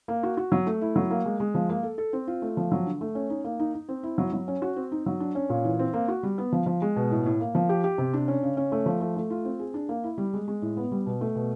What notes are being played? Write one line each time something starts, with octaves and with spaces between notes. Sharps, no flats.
A#3
F#4
F#4
F#3
A3
E4
F#3
A#3
G#3
G#3
F3
A#3
A4
A4
C4
F4
A3
F3
F#3
D3
A3
C#4
D#4
A#3
D#4
D#4
C4
E4
F#3
F#3
C#4
F#4
C4
D#4
F#3
D4
C#4
A#2
E3
C4
A#3
F#4
G3
B3
F3
F3
G#3
B2
A2
A2
A#3
F3
G4
G4
C3
D4
C#4
C#3
C#4
A3
F3
A3
A3
F4
C4
G#4
D4
A#3
E4
G3
G#3
G#3
A2
B3
G3
B2
A3
B2